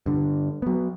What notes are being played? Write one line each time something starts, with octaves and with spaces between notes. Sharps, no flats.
G2 D3
F#3 B3